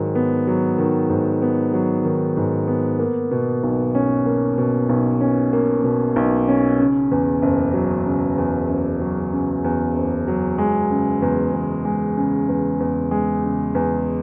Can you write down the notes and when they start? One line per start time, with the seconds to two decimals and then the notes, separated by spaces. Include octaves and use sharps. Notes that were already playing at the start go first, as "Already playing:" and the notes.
Already playing: G#2 D#3 F#3
0.15 B3
0.47 F#3
0.78 D#3
1.10 G#2
1.42 B3
1.73 F#3
2.04 D#3
2.37 G#2
2.67 B3
2.99 A#3
3.31 B2
3.63 B1
3.95 C#4
4.26 A#3
4.58 B2
4.89 B1
5.21 C#4
5.53 A#3
5.84 B2
6.16 B1
6.48 C#4
6.80 C#3
7.11 E2
7.42 F#1
7.73 F#3
8.06 C#3
8.38 E2
8.69 F#1
9.00 F#3
9.32 C#3
9.64 E2
9.96 F#1
10.28 F#3
10.58 G#3
10.91 C#3
11.22 E2
11.53 E2
11.85 G#3
12.17 C#3
12.49 E2
12.80 E2
13.11 G#3
13.44 C#3
13.75 E2